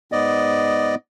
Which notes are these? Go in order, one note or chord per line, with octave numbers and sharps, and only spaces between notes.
G#2 B3 D5 D#5